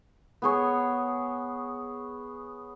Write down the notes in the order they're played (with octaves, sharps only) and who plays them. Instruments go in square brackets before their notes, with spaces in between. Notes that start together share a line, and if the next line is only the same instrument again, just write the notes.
[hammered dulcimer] B3 G#4 C#5